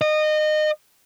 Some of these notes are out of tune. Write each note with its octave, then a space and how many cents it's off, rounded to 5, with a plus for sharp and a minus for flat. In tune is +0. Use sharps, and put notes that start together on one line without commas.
D#5 -25